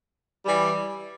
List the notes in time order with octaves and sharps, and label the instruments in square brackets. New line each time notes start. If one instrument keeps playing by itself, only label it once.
[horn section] E3 G3